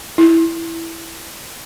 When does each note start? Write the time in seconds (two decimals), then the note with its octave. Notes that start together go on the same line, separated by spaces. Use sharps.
0.18 E4